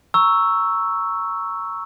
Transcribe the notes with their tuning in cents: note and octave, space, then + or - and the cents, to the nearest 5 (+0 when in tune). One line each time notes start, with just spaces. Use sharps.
A#5 +0 C#6 +0 E6 +0